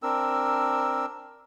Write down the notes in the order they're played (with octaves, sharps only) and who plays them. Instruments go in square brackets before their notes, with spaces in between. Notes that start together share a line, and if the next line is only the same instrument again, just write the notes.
[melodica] C4 D4 A#4 E6